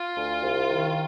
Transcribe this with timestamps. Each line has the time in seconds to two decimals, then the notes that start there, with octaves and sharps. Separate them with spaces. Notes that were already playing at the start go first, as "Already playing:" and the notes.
Already playing: F4
0.16 D2
0.42 C2
0.68 D#3